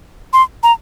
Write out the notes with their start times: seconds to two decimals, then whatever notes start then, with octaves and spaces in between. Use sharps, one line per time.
0.33 C6
0.63 A#5